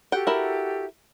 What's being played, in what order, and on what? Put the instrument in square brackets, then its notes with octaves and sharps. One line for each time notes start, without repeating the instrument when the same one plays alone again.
[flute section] F#4 G4 A4 [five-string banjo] F#5 G5
[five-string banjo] E4 A#4